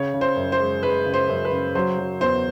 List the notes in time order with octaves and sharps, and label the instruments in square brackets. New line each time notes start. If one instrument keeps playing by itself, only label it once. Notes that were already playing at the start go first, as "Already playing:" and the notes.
Already playing: [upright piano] C#3 [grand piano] C#5
[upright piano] C#3
[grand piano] C5
[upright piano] F#2
[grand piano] C5
[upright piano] G#3
[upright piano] G#3 [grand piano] B4
[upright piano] C#3
[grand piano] C5
[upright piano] F#2
[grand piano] B4
[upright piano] C#3
[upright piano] F#3 [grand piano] C5
[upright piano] F#3
[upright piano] E2 [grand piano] C5